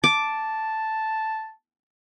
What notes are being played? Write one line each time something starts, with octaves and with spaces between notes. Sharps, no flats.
A5 D6